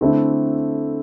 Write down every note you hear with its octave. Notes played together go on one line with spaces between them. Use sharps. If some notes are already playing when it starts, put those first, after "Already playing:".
D3 A3 C4 E4